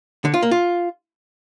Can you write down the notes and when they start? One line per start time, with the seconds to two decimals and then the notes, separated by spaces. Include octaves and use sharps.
0.25 D3
0.34 F4
0.43 A#3
0.51 F4